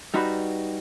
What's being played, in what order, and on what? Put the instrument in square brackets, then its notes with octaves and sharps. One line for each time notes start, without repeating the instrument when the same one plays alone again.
[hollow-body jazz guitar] G3 D#4 F#4 B4